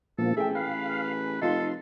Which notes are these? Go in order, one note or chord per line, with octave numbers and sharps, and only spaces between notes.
E1 A#2 F3 A#3 A4
A1 A3 G#4 E5 G5
B4 F5
F1 D#4 F4 A4 C6